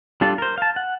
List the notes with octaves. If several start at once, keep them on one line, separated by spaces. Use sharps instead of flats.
G3 D4 F4 A4 D5
A#4 C5
F5 A5
F#5